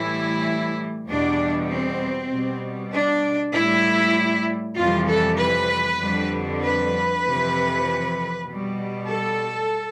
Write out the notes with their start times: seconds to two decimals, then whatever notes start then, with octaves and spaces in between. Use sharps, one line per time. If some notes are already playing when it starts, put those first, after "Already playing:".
Already playing: A2 E3 G3 E4
1.08 E2 B2 G3 D4
1.70 C4
2.31 B2 G3
2.93 D4
3.54 A2 G3 E4
4.77 F2 C3 E3 G3 F4
5.08 A4
5.38 B4
6.00 F2 D3 G3
6.61 B4
7.23 F2 C3 E3
8.46 B2 G3
9.07 A4